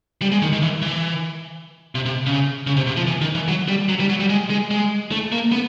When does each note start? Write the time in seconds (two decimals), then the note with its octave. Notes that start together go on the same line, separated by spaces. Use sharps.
0.22 G3
0.32 G#3
0.42 D#3
0.53 D#3
0.62 E3
0.82 E3
1.95 C3
2.06 C3
2.26 C#3
2.67 C#3
2.77 C3
2.87 C3
2.97 F3
3.07 E3
3.21 D#3
3.35 E3
3.48 F#3
3.68 G3
3.89 F#3
4.00 G3
4.09 F#3
4.20 G3
4.30 G#3
4.50 G#3
4.71 G#3
5.12 A3
5.32 A#3
5.52 B3